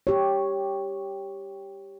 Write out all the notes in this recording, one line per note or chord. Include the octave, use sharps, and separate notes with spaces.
G4 C#5